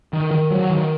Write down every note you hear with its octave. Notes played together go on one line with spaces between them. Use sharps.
D#3
D#3
F#3
D#3